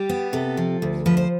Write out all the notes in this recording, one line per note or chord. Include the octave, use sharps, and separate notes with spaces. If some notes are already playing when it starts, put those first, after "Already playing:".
Already playing: G3 G4
B3
C3 A4
F3
D2
F3 B4
C5